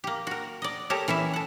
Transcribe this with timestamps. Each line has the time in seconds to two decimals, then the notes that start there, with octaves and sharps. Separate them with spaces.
0.04 A#3 G4
0.27 F#4 A#4
0.62 D5 D#5
0.90 G4 A4 A#4 C#5
1.08 E3 C#4 E4 E5
1.33 A4 F#5